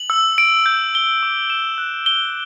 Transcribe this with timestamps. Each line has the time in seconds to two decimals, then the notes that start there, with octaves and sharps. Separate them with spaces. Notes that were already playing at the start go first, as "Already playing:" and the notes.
Already playing: F#7
0.10 E6
0.38 D7
0.66 G6
0.95 G7
1.23 D6
1.50 E7
1.78 F#6
2.06 G7